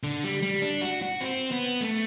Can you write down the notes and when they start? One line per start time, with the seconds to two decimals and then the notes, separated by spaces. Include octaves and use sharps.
0.03 D3
0.24 G3
0.42 G3
0.62 D4
0.81 F#4
1.02 F#4
1.21 C4
1.51 B3
1.81 A3